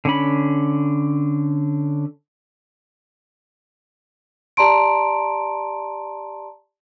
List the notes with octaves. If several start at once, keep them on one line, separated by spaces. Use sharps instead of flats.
D3 C#4 B5
G4 D5 A5 A#5 C6 D7